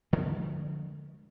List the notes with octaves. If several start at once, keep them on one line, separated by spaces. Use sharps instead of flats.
D3 F3 G#3